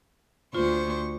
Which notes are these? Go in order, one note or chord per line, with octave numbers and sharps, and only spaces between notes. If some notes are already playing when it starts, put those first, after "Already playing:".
D2 F4 C5 C#6